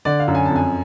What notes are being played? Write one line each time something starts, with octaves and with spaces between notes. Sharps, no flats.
D3 D5
F5
F#2
G#5
F2 A5
G#5